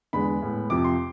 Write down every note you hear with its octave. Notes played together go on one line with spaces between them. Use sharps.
E2 D3 G#3 B3 B5
A2 G#3 B3
F2 C3 F3 D6
C6